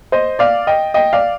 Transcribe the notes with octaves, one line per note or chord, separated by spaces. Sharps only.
C5 D#5
D5 F5
D#5 G5
D#5 G5
D5 F5